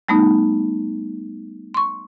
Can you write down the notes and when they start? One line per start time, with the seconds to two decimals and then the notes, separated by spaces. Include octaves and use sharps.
0.08 G3 A3 B3 D#4
1.74 C6 C#6